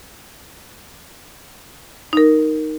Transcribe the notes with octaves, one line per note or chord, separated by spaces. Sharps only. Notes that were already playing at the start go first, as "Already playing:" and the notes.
D#4 A#4